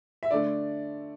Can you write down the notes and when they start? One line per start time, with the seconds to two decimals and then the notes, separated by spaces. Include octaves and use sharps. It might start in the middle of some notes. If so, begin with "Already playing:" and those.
0.23 E5
0.31 D3 A3 D4 D5